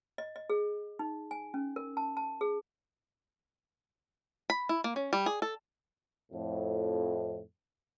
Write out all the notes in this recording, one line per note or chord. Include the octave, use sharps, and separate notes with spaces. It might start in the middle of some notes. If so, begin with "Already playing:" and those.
D#5
D#5
G#4
D#4
G#5
C#4
A#4
A5
A5
G#4
B5
E4
A#3
C#4
G3
G#4
A4
F2 A2